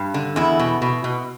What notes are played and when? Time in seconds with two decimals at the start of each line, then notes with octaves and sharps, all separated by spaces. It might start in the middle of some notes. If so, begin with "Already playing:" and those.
Already playing: G2
0.14 D3
0.36 E2 E4
0.59 B2
0.82 B2
1.04 B2